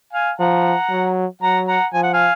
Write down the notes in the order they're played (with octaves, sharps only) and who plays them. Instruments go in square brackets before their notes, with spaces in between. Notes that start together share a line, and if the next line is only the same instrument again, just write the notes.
[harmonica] F5 G#5
[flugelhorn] F3 [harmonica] F#5 A#5
[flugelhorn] F#3
[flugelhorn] F#3 [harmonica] F#5 A#5
[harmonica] F#5 A#5
[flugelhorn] F3 [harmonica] G#5
[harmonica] F#5
F5 G#5